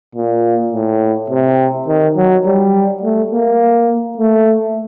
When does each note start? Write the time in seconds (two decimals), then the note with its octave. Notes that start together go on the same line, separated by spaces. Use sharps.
0.15 A#2
0.73 A2
1.30 C3
1.87 D#3
2.16 F#3
2.46 G3
3.03 A3
3.31 A#3
4.18 A3